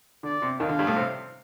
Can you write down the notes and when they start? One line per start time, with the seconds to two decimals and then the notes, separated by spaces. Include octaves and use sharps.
0.23 D3 D5
0.42 C3
0.60 D#2 D#3 F5
0.69 D3
0.79 G2 G3
0.87 A2 A3
0.96 C3 C4